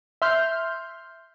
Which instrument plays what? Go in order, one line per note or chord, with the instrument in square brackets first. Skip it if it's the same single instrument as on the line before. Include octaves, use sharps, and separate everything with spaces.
[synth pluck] E5 C6 F6 G6